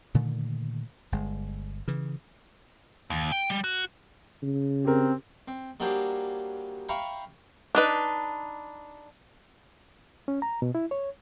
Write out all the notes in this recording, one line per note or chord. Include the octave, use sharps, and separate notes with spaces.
A#2 D3 D#3 A3
G1 G#3
C#3 E3
D#2
G5
G3
F#4
C#3
C4 G4 A#4
C4
F#3 G3 A#3 D4 G#4 C5
E5 F5 G5 A#5 B5 C#6
D4 D#4 B4
C#4
A#5
B2
E4
C#5